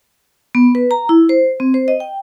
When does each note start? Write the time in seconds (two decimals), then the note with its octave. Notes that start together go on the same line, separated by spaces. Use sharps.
0.55 B3
0.75 B4
0.91 A#5
1.09 E4
1.29 C5
1.60 C4
1.74 C5
1.88 D#5
2.00 G5